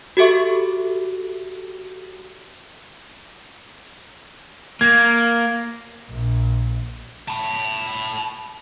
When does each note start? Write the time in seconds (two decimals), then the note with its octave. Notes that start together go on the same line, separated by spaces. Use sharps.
0.17 F#4 G4 A4 E5 C#6
4.81 A#3 G#6
6.09 A#1
7.28 A5 B5